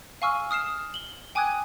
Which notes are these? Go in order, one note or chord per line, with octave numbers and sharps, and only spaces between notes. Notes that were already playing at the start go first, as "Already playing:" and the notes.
F5 G#5 C#6 E6 F6
D#6 F6 C7 E7
F#7 G7
G5 G#5 D6 D#6 F#6 G#6